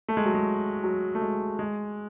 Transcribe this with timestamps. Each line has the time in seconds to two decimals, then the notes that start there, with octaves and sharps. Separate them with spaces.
0.08 A3
0.17 G#3
0.25 F#3
0.34 G#3
0.84 F#3
1.15 A3
1.21 G#3
1.59 G#3